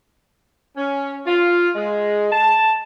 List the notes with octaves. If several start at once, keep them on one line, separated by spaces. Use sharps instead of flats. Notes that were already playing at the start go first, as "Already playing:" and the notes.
C#4
F4
G#3
A5